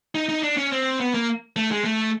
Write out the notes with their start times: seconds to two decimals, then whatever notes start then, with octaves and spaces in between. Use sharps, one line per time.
0.15 D#4
0.29 D#4
0.43 D4
0.57 C#4
0.72 C4
1.00 B3
1.14 A#3
1.56 A3
1.71 G#3
1.84 A3